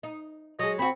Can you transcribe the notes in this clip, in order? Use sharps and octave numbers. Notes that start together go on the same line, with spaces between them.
D#4
F#3 G#3 D#5
C4 F#4 B5